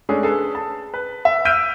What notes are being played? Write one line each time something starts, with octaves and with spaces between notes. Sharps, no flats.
G#3 A3 C#4 D4 G#4
G#4 A4 B4
A5
B4
E5
E6 F6 G6 B6 D7 D#7